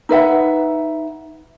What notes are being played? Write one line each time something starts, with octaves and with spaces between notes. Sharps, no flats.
D#4 B4 E5 F#5